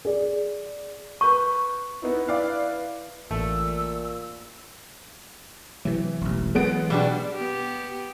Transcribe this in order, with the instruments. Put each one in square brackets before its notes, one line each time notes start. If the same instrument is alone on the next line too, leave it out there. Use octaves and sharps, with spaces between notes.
[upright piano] G#4 D5
[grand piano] B4 G6 D#7 [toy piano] C#6
[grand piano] B3 D#4 E4 [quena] B4
[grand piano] E4 [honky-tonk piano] D5 F5
[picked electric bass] A1 [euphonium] A#2 [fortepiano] A3 [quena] E6
[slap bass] C3 F#3 [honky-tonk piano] E3
[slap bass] E1 A1
[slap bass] E3 F#3 [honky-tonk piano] G#3 B3 D7
[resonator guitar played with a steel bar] B2 G3 D4
[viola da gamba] B3 G4